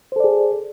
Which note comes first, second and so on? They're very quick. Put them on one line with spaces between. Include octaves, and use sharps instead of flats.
C5 A4 D5 G#4